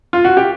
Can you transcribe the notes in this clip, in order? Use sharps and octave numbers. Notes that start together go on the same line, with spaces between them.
F4
F#4
G4